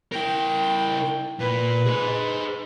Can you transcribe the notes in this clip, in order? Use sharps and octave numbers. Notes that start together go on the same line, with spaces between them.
E4 A#4 G5
A#2 B4
G#4 C5